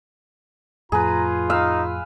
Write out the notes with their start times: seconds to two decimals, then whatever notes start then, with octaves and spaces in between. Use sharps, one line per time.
0.92 F2 A2 F4 G#4 B4 A#5
1.50 D#4 B4 F5 E6